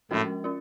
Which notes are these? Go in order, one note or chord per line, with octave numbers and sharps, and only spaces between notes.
A2 F3 G#3 C#4 F#4 A#4
C#4 F4